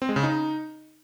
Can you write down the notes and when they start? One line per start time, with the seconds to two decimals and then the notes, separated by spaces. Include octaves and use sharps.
0.02 C4
0.09 G#3
0.16 C#3
0.23 D#4